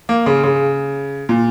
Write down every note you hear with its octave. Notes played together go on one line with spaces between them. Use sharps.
A#3
C#3
C#3
A#2